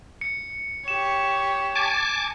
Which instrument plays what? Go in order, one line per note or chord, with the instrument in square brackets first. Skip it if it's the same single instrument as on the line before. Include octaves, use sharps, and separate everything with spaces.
[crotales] C#7
[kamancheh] G4 C#5 [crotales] E7
[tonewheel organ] G#5 A5 D6